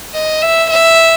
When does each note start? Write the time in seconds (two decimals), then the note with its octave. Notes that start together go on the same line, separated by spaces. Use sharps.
0.14 D#5
0.42 E5
0.70 E5